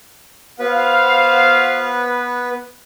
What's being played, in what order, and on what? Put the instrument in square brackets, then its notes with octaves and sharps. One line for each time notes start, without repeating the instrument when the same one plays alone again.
[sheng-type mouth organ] B3 B4 [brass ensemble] F#4 C5 F5